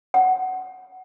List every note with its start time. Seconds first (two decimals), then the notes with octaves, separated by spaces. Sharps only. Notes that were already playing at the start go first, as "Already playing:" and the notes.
0.14 F#5